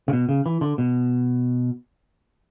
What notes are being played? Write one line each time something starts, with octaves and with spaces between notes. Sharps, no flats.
C#3
B2
C#3
E3
D3
B2